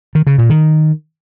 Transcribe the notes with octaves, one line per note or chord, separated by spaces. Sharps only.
D#3
C#3
A#2
D#3